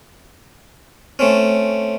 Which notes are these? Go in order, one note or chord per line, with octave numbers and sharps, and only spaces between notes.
A3 C4 C#4